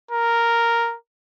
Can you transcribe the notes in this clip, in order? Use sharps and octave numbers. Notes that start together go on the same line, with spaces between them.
A#4